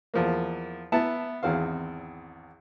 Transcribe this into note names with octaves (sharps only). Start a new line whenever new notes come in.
E2 F3 A#3
B3 E4 A5
G#1 E2 C4 C5 F5